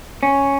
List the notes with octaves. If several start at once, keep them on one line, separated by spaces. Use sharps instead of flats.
C#4